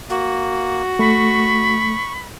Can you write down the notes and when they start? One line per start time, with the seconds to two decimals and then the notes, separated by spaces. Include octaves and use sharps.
0.10 A#3 F#4
0.99 A3 B5 C#6